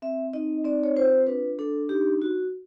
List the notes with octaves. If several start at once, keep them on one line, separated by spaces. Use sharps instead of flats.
C4 E5
D#4 D#5
C4 D5
C#5
F4 C5
D4 B4
D4 A4
D#4 G4
F#4